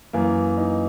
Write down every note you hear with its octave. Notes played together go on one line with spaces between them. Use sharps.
F#2 E3 A#3
D#4